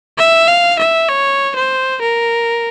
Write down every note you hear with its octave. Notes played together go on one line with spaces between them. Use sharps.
E5
F5
E5
C#5
C5
A#4